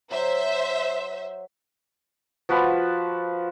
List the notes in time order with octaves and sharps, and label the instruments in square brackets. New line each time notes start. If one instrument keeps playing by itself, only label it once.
[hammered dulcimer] F#3 [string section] C5 E5
[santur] F3 F#4 B4 A5